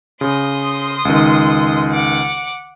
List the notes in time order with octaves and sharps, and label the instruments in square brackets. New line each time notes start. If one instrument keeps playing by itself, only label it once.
[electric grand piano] C#3 [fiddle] C6 D#6
[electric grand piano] C#2 D#3
[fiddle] F#5 D6